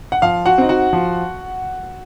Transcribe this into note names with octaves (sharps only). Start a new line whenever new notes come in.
F#5
F3 F5
F#4 F#5
C4 D#4
F#4 F#5
F3